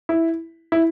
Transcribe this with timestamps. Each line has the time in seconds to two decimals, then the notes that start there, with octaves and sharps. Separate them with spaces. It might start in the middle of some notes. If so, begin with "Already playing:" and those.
0.09 E4
0.72 E4